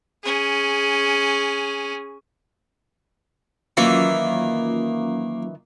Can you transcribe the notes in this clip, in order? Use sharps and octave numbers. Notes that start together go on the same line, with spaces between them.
C#4 G#4
D#3 E3 F#3 A#3 C#4 F4